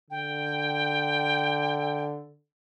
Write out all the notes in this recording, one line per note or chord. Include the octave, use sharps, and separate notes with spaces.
D3 G5